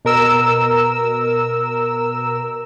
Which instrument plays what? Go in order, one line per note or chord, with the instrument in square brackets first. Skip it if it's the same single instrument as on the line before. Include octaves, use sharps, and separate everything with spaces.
[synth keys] B2 A#4 E6